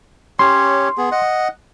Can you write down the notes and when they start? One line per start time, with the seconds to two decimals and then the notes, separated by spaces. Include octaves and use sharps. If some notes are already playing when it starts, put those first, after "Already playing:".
0.39 C#4 G4 C#5 C6
0.98 B3 G#4
1.12 D#5 F#5